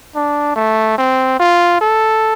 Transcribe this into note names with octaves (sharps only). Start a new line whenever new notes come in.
D4
A3
C4
F4
A4